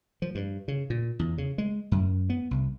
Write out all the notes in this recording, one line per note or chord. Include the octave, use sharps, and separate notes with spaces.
F3
G2
C#3
A#2
E2
C#3
G#3
F#2
B3
C2